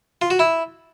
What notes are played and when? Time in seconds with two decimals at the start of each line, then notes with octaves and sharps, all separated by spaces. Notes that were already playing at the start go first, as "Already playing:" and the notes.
0.22 F4
0.30 F#4
0.39 E4